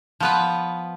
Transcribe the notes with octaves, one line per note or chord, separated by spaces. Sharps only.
F3 B3 B4